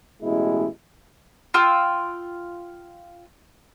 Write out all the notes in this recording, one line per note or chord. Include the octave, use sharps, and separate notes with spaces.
A1 B2 G#3 E4
F4 G5 E6